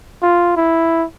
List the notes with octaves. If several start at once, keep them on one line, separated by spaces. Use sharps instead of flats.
F4
E4